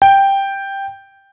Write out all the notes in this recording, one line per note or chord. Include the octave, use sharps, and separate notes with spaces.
G5